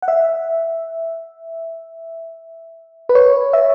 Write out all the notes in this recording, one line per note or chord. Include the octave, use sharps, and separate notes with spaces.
F#5
E5
B4
C#5
E5